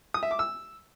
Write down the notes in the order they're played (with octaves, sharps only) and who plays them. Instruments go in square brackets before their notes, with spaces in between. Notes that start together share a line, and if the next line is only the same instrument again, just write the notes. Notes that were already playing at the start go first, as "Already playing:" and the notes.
[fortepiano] D#6
E5
D6
E6